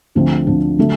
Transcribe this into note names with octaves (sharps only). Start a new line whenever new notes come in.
D2 D3 F3 A3 C4
D2 D3 F3 A3 C4
D3 F#3 A3